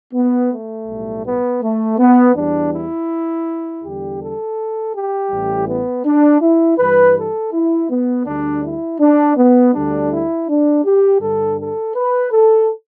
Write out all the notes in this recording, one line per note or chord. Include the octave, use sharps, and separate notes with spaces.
B3
A3
B1 A2 G3
B3
A3
B3
E2 E3 G3 D4
E4
E2 D3 G3 G4
A4
G4
A1 A2 E3 G3
B3
D4
E4
G2 E3 G3 B4
A4
E4
B3
D2 D3 G3 D4
E4
D4
B3
D2 D3 G3 D4
E4
D4
G4
G2 D3 G3 A4
A4
B4
A4